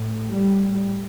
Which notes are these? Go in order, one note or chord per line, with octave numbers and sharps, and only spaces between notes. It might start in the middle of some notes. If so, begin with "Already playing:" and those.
Already playing: A2
G3